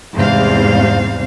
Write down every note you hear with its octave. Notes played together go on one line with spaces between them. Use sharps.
E2 G#2 C3 G3 C5 F5